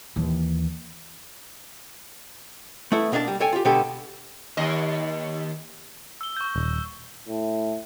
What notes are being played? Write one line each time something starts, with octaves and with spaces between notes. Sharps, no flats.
D#2 E3
A3 B3 E4
B2 A#3 D4 D#5 A5
G3
A4 C#5 G5 G#5
F4 G4
B2 D3 G#3 B3 G4 A4
D#2 D#5
E6 G7
C#6 G6
D#1
A2